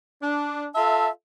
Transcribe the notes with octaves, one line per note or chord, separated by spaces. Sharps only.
D4
F4 A4 E5 A5